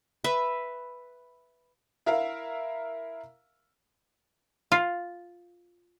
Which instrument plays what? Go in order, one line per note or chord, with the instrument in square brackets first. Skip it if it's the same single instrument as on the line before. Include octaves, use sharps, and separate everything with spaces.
[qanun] B4 E5
[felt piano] E4 A#4 E5 F5
[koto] F4